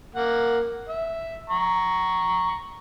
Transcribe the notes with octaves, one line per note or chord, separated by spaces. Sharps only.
A#3 F#5
E5
A#5 C#6